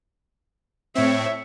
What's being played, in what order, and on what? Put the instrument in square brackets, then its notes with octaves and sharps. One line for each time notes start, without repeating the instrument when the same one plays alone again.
[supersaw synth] A2 C4 [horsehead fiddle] C#5 E5